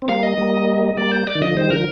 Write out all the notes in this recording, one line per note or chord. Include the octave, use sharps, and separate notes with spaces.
C4
G3 A#3 F5
D#5
G3 A#3
G3 A#3 D5
C5
D5
D#3
D3 F3 D#5
D#3 G3 C5
D3 F3 A#4